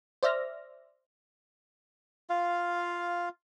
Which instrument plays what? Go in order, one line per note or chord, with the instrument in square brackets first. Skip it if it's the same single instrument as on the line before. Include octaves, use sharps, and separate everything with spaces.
[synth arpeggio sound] C5 D5 E5 F6 A#6
[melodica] F4 F5